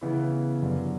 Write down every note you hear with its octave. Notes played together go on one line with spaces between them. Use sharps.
C#3 E3 B3 E4
F#2 D3 G3